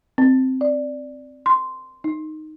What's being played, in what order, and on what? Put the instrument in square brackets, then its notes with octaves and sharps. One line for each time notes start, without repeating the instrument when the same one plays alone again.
[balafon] C4
D5
C6
D#4